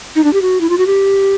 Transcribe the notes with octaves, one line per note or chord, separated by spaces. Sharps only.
D#4
D4
G4
F#4
E4
F4
F#4
G4